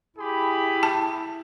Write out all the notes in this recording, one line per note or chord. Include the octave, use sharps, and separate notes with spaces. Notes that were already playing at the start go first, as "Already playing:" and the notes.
E4 G4 G#4 B5
A5